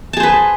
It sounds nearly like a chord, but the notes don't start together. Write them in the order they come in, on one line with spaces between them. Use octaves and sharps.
A5 G#4 C5 B4